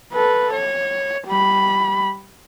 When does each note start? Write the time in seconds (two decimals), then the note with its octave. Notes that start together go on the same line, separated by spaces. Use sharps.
0.13 A4 B4
0.52 C#5
1.27 G3 B5